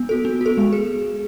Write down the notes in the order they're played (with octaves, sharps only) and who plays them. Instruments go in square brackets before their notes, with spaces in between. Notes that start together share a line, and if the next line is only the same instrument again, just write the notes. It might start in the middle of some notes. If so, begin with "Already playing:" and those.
Already playing: [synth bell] B3
F#4 A4
B3
F#4 A4
G#3
G#4